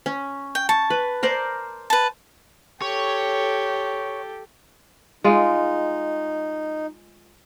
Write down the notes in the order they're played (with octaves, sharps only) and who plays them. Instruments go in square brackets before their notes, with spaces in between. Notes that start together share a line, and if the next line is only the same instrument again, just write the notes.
[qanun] C#4
[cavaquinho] G5
[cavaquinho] A5 [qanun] C#6
[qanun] B4
A#4 C5 D5
[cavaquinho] B4 A5
[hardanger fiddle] G4 A4 [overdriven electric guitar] C#5
[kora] G#3 F4 [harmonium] D#4